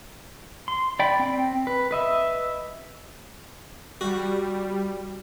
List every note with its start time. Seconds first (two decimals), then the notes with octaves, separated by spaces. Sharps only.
0.68 C6
0.99 D5 G5 B5
1.20 C4 G5
1.67 B4
1.91 B4 D#5 E5
4.01 G3 F#4